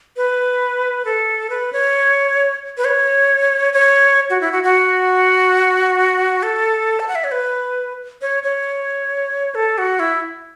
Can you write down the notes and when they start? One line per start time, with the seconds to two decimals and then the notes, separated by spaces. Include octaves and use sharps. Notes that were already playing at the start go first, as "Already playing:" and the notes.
0.17 B4
1.05 A4
1.50 B4
1.73 C#5
2.78 B4
2.85 C#5
3.73 C#5
4.30 F#4
4.41 E4
4.52 F#4
4.64 F#4
6.43 A4
7.00 A5
7.08 F#5
7.15 E5
7.24 C#5
7.31 B4
8.22 C#5
8.43 C#5
9.55 A4
9.78 F#4
10.00 E4